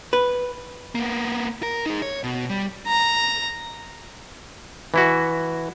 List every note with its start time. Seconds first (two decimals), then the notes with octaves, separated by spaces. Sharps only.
0.13 B4
0.95 A#3 B3
1.63 A#4
1.86 D#4 G#4
2.02 C#5
2.23 B2
2.49 G3
2.87 A#5
4.94 E3 E4 F#4